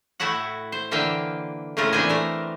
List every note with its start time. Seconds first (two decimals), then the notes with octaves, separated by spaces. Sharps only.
0.20 A2 A3 E4 F#4 F#5
0.72 C5
0.91 D3 E3 A#3 E5 F5 G5
1.77 A2 C#3 A3 F4 A#4
1.93 A#2 E3 C4 D4 C5 G#5
2.09 A3 A#4